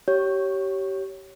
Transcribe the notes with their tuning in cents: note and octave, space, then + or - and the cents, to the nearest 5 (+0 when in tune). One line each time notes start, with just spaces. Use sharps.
G4 -25 C#5 +0